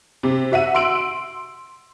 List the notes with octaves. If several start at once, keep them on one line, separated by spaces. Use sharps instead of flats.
C3
F#4 E5 F#5 D#7
C6 E6 D7 F#7